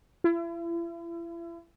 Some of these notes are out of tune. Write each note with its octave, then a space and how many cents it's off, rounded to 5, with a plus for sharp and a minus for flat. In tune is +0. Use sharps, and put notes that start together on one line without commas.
E4 +40